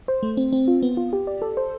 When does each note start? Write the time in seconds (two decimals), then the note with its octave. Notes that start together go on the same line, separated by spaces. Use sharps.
0.08 C5
0.23 A3
0.37 C4
0.53 C4
0.68 F4
0.83 B3
0.97 F4
1.13 G4
1.27 D5
1.42 A4
1.57 C5